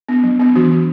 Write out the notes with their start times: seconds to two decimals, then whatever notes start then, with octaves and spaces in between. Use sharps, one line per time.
0.09 B3 D4
0.23 F#3
0.40 B3 D4
0.56 E3 F#4
0.72 D4